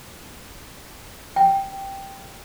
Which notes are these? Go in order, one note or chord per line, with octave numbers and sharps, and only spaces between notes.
G5